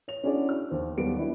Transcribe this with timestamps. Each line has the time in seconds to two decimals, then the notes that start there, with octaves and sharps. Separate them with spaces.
0.08 C#5 F7
0.23 C#4 D4 E4 F#4 G#4 D5
0.49 F6
0.70 D#2 C5
0.97 D#2 F#3 G3 B3 D7
1.18 D4 E4